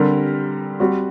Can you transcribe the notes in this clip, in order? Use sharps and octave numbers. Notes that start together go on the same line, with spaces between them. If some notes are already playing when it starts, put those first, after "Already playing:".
Already playing: D3 G3 C4 G4 A#4
G3 C4 F#4